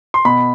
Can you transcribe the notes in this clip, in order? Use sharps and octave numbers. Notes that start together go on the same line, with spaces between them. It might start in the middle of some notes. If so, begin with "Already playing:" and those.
C6
B2 B5